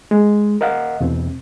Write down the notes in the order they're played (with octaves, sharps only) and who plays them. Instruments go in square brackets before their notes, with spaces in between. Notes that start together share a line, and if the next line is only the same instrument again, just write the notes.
[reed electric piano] G#3
A#4 D#5 F5 F#5
E2 B2 C4